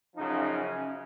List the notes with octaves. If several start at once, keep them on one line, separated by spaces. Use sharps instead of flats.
F#2 C#3 F3 D#4
C#4